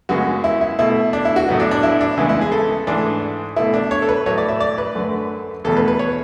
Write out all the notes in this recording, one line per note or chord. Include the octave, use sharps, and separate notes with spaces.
F#2 C#3 G#3 B3 F#4
E4
E4
B2 A3 E4
D4
E4
F#4
A2 F#3 B3
D4
D4
E4
D4
C#3 E3 G#3 B3 E4
E4
G#4
A4
G#2 E3 A3 D4
B2 A3 E4
D4
C#5
A4
B4
A2 F#3 A3 C#5
D5
E5
D5
B4
F#2 D3 A3
E2 B2 A3 A4
B4
B4
C#5